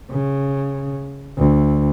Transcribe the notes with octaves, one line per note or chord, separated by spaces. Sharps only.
C#3
D2